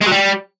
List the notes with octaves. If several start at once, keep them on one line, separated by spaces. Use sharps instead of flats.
G#3
F#3
G3